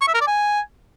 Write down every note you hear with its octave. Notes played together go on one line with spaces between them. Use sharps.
C#6
E5
A#4
D5
G#5